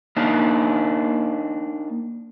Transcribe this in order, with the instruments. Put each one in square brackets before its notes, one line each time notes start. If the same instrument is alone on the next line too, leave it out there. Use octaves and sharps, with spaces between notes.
[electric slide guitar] A#3 D4 D#4